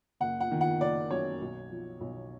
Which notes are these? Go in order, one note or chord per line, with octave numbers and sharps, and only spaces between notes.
F#1 F#5
F#5
D#3
F#5
F#1 D5
F#2 C#5
B1
F3
B1